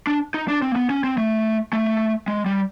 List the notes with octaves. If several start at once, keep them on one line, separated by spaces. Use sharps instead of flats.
D4
D#4
D4
C4
A#3
B3
C#4
C4
A3
A3
G#3
G3